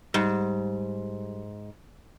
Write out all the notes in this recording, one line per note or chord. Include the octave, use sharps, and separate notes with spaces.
G#2 G3